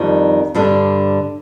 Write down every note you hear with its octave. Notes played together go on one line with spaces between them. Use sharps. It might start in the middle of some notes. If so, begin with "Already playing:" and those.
Already playing: F2 D#3 G3 D4
G2 D3 G3 D4